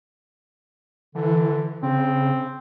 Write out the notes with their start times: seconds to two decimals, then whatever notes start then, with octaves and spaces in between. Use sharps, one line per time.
1.15 D3 E3
1.83 C#3 C4